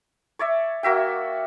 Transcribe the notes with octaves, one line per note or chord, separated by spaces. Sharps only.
C#5 D5 E5
A#3 F#4 E5 G5